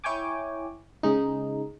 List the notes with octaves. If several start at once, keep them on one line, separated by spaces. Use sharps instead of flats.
E4 C#5 G5 G#5 D6
C#3 G#3 D#4